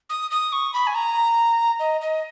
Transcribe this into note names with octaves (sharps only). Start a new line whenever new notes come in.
D#6
D#6
C#6
B5
G#5
A#5
D#5
D#5